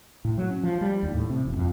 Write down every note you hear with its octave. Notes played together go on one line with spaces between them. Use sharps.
A2
F#3
C#4
F3
G3
D#2
A2
C3
E1
F2